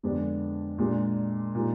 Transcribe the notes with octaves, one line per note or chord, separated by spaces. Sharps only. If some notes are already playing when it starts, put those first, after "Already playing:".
F2 D3 G#3 B3 D4
A#2 G#3 D4
A#2 F3 G#3 D#4